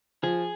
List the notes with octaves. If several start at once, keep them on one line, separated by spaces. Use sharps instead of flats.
F3 G#4